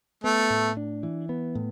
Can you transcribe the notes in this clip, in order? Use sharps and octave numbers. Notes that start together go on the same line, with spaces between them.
A3 B3
A2
D4
E3
B3
A2